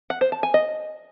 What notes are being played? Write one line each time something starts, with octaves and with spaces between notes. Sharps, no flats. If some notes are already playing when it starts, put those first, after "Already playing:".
F#5
C5
A5
G#5
D#5